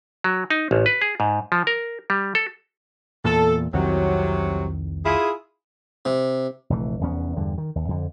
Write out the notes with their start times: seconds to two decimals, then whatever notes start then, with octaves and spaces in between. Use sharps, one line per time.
0.24 F#3
0.50 D#4
0.71 A1
0.86 B4
1.01 G#4
1.20 G#2
1.52 F3
1.67 A#4
2.10 G3
2.35 A4
3.25 E2 A#2 A4
3.73 C2 F2 C3 D#3 F#3
5.05 E4 F4 G#4
6.05 C3
6.70 F1 A#1 E3 A3
7.01 F1 E2 B3 C#4
7.37 E2 G2 D3
7.58 D#3
7.75 D#2
7.88 F2 D3